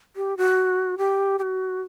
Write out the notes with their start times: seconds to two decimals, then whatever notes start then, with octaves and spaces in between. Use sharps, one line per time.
0.16 G4
0.37 F#4
0.98 G4
1.39 G4
1.42 F#4